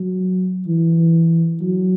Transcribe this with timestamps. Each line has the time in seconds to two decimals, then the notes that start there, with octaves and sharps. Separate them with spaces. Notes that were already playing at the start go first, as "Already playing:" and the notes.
Already playing: F#3
0.67 E3
1.61 F#3